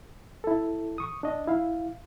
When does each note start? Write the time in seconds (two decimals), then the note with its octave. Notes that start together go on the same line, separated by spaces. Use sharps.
0.44 E4 A4
0.98 C#6 D#6
1.23 D4 D#5
1.48 E4 F5